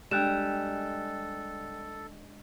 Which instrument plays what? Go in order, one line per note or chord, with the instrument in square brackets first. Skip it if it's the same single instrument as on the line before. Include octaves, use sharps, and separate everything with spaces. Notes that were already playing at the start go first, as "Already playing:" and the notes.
[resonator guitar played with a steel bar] G3 [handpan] G#3 D4 [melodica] A4 [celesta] G5 F#6 E7